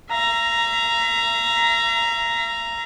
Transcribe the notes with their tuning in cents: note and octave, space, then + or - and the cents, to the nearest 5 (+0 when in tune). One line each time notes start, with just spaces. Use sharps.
E5 +40 A#5 +0